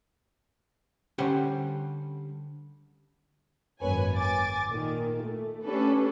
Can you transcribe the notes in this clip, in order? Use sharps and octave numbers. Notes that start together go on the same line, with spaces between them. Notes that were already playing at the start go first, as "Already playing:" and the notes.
D3 G3 C#4 G4 C5 F#5
G#1 F#2 A#3 B4 C#5 G#5
G#5 D6 A6
A#2 D#3
A3
A3 C#4 D4 G4 A4 B4